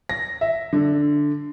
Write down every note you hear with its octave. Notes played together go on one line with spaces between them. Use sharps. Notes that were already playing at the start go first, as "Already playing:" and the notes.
A#6
E5
D3